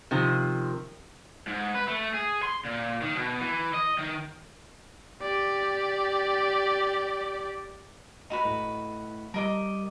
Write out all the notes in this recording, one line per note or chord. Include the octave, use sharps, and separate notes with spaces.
C3 D#3 F3
G#2
B4
A3
G#4
C6
A#2
D#3
B2
E3
D#5
D#3
G4 D5
D#4 F#4 B4
A2
G3 A#4 D#5 D6